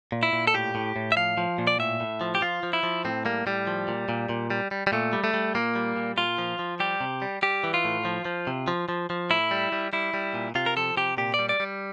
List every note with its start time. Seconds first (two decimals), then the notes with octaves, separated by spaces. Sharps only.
0.12 A#2
0.23 E4
0.33 A#2
0.47 A4
0.54 A2 G4
0.75 A2
0.96 A2
1.12 E5
1.17 F3 F5
1.38 F3
1.58 A#2
1.67 D5
1.79 A2 E5
2.00 A2
2.21 F3
2.35 G4
2.41 F3 F4
2.63 F3
2.73 E4
2.83 F3
3.05 A2 C4
3.25 G3 A#3
3.46 A2 G3
3.67 F3
3.88 A#2
4.09 A#2
4.29 A#2
4.50 G3
4.71 G3
4.87 G3
4.92 A#2 A3
5.13 G3
5.24 A3
5.34 G3
5.55 A#2 A#3
5.75 G3
5.96 A#2
6.17 A#2 F4
6.38 F3
6.59 F3
6.80 G3 G4
7.01 C3
7.22 G3
7.42 G3 G4
7.64 E3
7.74 F4
7.84 A2
8.05 F3
8.25 F3
8.47 C3
8.68 F3
8.89 F3
9.10 F3
9.30 A2 E4
9.51 G3
9.72 G3
9.93 G3 E4
10.14 G3
10.35 A#2
10.55 C3 F4
10.66 A#4
10.76 F3 A4
10.97 C3 G4
11.17 A#2 G4
11.34 D5
11.39 G3
11.49 D5
11.60 G3